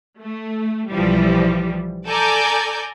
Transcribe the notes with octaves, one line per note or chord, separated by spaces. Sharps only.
A3
B1 E3 F3 G3
A4 D5 G#5 A#5 G6